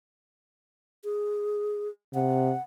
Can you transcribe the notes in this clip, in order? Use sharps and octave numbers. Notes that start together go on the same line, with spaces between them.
G#4
C3 F#5